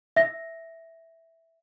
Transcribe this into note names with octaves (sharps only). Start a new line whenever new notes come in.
E5 A#6